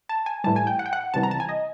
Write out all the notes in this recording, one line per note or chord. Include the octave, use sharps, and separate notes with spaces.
A5
G#5
A2 E3 G3 A5
G#5
G5
F#5
G5
F#5
C#2 C3 E3 G3 A5
A#5
A5
G#5
D#5